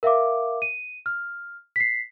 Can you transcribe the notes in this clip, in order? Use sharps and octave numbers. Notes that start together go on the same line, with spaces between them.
A#4 E5 F5 D6
D#7
F6
B6 C7